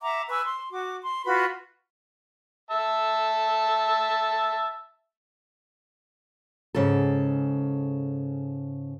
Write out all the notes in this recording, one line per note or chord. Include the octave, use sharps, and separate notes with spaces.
E5 F#5 A#5 D6
B4 G#5 C#6 E6
C6
F#4 D6
C6
F4 F#4 B4 B5
E5 A5
G#2 C#3 A4